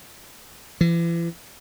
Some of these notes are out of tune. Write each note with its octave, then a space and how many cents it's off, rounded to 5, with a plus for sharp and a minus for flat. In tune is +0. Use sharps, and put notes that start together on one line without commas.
E3 +40